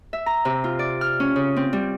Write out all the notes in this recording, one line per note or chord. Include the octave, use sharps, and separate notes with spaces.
E5
A#5
C3
F4
D5
F6
C#4
C#3
C4
G3